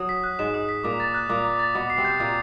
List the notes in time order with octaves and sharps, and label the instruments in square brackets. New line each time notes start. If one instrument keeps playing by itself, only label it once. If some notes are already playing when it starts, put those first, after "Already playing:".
Already playing: [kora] F#3 [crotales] D#6
[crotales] B6
F#6
[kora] G#2 G#3 [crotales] E7
[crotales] D#6
B6
[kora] A#2 A#3 [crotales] D6
[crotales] A6
F#6
[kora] A#2 A#3 [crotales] D6
[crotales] D6
A6
[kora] B2 B3 [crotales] D6
[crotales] C7
[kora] C3 C4
[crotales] G6
[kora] A#2 A#3 [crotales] D6